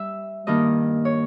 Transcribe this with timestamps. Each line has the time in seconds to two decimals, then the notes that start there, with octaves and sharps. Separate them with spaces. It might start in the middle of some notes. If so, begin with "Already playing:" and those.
Already playing: G3 E5
0.47 G2 D#3 A#3 D#5
1.05 C#5